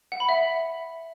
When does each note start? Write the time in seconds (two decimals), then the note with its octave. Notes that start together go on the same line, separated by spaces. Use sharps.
0.12 F#5
0.20 B5
0.29 E5